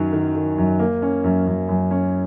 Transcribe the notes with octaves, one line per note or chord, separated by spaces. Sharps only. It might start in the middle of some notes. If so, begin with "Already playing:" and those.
Already playing: F#2 D#3 F#3
D#3
D#3
F#2
A#3
C#4
F#2
F#2
F#2
C#4